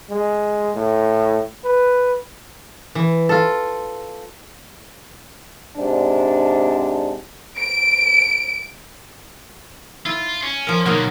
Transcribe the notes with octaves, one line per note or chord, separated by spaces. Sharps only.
G#3
A2
B4
E3
F4 A4
G#2 C3 D4
D7
E4 F4
C#4
F3 A#4
B2 D3 F#3 A#3 D#4